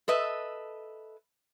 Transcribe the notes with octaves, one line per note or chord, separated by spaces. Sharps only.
A4 B4 D#5 E5